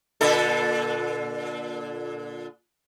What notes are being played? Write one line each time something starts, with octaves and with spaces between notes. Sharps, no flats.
A#2 D3 A4